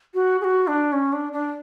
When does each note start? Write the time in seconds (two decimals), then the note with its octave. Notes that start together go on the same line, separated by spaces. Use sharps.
0.14 F#4
0.41 G#4
0.44 F#4
0.67 D4
0.93 C#4
1.13 D4
1.33 D4